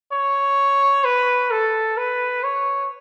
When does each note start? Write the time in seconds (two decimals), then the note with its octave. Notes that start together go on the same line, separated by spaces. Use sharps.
0.12 C#5
1.05 B4
1.51 A4
1.97 B4
2.44 C#5